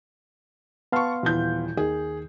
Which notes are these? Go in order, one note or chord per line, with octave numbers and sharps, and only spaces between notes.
B3 F5 A5 C6 C#6
D#1 E3 G6
D#2 D#3 G#4